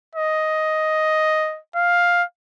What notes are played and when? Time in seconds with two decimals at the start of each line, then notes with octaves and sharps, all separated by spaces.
0.15 D#5
1.76 F5